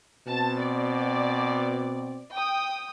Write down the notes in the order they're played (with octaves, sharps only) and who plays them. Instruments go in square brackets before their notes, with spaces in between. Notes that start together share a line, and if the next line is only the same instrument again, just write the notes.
[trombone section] B2 C4 [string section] A5 A6
[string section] D5
G5 D#6